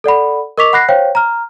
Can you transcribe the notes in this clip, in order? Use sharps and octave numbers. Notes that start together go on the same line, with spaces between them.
A4 D5 F#5 B5
A#4 D#5 C#6 D6 B6 F7
F#5 B5 F#6 A#6 C7
C5 C#5 F5 G5
A#5 F6